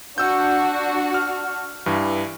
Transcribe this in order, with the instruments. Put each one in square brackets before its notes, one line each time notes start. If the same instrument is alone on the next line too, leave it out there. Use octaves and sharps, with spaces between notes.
[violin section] D4 F#4 [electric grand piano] F#5 E6 G6
[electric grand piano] F6
G2 E3